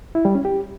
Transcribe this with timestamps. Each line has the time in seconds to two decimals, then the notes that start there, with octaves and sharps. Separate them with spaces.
0.15 E4
0.25 G3
0.35 C#4
0.45 G4